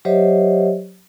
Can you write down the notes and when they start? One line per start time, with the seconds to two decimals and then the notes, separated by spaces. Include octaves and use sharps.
0.05 F#3 G4 C5 C#5 D#5 E5